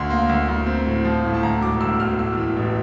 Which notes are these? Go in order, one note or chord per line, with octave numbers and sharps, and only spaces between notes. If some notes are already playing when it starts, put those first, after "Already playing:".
Already playing: D2 C6
A#3
D2
D2
C4
A2
F3
A2
A5
D2 A#5
E1 D6
D2 E6
E1 F6
A2 E6
E3
A1